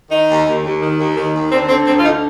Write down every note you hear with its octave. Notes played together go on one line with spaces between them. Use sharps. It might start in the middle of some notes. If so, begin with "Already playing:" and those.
D#3 D#4
D#2
D#2
D#2
D#3
D#2
D#3
D#2
D3 C4
D3 C4
D2 C4
F4
D3 D#4